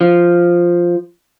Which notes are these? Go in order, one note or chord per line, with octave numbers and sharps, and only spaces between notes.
F3